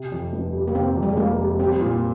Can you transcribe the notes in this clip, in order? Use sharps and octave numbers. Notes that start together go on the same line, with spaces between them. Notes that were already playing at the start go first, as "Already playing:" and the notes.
Already playing: C3
F2
F1
G3
A#3
C3 C4
F2
G3
G#3
F1 A#3
G3
G3 C4
A#2